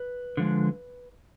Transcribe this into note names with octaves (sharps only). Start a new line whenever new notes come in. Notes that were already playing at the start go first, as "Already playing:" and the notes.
Already playing: B4
D3 F3 G#3